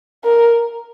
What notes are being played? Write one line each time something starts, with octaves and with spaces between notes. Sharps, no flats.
A#4